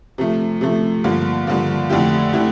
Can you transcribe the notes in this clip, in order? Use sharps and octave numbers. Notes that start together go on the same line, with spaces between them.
C3 F3 A3
C3 F3 A3
G2 D3 F3 A#3
G2 D3 F3 A#3
F2 D3 A3 E4 G4
D3 A3 E4 G4